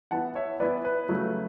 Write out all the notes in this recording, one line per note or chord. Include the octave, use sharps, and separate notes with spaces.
E3 B3 E4 F#5 A5
C#5 E5
E3 B3 E4 B4 D5
B4
C#3 F#3 A3 E4